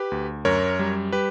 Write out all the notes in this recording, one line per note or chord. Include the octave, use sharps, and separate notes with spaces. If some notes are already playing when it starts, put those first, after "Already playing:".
Already playing: G4 B4
D2
F#2 A#4 C#5
G3
G4 B4